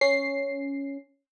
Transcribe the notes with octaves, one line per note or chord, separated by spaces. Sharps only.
C#4 C7